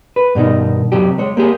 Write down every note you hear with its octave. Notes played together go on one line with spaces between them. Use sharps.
B4
G2 B2 D#3 D#4
F#2 C3 F#3 G4
G#3 C#5
A#3 G4 G#4